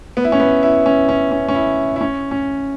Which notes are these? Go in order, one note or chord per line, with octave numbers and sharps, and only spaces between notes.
B3
E4
C#4
B3
E4
C#4
C#4
C#4
C#4
E4
E4
C#4
C#4